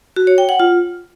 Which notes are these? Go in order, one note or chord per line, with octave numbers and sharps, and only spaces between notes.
F#4
C#5
G5
F#5
F4